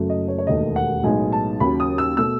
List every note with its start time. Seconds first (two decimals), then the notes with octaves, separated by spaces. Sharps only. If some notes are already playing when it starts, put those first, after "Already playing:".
Already playing: F#1 F#2 C#3 F#3 A3
0.10 D#5
0.28 C#5
0.38 C#5
0.47 E1 D#2 D#3 A3 D#5
0.76 F#5
1.03 B1 A2 G#3 B3 D#4 G#5
1.32 A5
1.60 D#2 C#3 F#3 B5
1.80 D#6
1.98 E6
2.17 B2 A3 E6